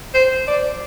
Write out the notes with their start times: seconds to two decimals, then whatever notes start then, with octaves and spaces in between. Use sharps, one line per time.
0.14 C5
0.48 D5